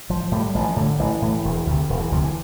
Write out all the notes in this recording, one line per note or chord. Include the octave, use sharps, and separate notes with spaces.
A1 F3
A2 G3
A1 F3
A2 D3
A1 E3
A2
E1
D2 C3
E1
E3
D2 C3 F3
E3